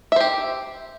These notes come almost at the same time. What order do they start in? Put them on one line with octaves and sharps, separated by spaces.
E5 C5 G4